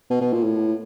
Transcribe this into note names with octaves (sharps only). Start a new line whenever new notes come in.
B2
B2
A#2
A2